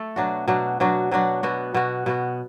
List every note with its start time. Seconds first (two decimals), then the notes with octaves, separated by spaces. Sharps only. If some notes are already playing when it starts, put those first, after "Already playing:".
Already playing: A3 A4
0.16 B2 F#3 D4 F#4
0.48 B2 F#3 D4 F#4
0.80 B2 F#3 D4 F#4
1.11 B2 F#3 D4 F#4
1.43 B2 B3 F#4
1.74 B2 B3 F#4
2.06 B2 B3 F#4